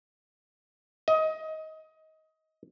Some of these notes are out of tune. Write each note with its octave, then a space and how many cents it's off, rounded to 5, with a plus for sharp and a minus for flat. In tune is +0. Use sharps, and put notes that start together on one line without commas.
D#5 +20